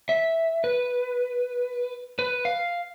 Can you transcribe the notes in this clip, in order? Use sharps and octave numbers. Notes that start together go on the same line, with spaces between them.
E5
B4
B4
F5